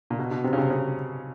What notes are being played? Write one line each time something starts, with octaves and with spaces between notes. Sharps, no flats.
A#2
B2
B2
C3
C#3
C3
C#3